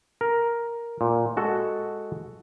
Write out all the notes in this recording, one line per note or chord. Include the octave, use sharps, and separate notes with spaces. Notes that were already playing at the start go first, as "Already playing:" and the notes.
A#4
A#2
G#3 F#4 A4